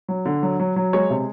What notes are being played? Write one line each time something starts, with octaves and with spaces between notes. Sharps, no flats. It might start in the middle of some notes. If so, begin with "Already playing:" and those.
F#3
D3
F#3
F#3
F#3
G#3 C#5
C3